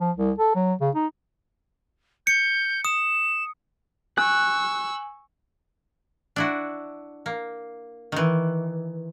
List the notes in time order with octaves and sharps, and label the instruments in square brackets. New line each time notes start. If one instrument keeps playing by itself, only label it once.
[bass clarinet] F3
C2
A4
F#3
C#3
D#4
[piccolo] G6 [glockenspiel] C#7
[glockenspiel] D#6 [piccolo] E7
[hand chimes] G#5 [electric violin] C#6 E6 [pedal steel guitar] F#6
[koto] D4 E4 F#4
A#3
D#3 E3